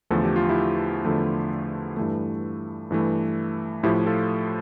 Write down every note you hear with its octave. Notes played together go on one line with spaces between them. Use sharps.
E2 D3 F3 A3 A4
G4
F4
E4 G4
E2 D3 F3 A3
G2 E3 A3
G2 E3 A3
A2 F3 A3 E4 G4
F4 A4